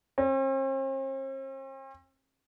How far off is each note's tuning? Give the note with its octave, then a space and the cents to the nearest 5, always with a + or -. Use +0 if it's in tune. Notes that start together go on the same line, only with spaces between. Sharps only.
C4 +45